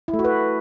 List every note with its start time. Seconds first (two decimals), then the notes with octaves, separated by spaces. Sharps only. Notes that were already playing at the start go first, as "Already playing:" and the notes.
0.08 E4
0.14 A3
0.19 F#4
0.24 B4